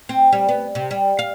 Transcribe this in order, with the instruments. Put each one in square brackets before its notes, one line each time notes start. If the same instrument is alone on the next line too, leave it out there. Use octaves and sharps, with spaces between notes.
[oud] C4
G3
B3
C3
G3
F5